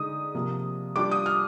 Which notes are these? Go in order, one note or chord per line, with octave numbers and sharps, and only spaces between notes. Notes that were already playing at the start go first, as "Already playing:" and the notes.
Already playing: D3 G#3 D#4 D#6
C3 F3 A#3
G3 D4 F4 D6
D#6
F6